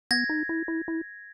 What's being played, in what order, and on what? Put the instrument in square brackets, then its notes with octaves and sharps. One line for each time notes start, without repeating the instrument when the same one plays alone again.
[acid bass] B3 [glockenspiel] G#6 A#6
[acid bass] D#4
E4
E4
E4